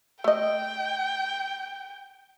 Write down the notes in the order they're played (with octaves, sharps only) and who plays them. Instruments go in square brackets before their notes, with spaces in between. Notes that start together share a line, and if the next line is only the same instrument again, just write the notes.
[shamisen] A3 D#5 [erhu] G5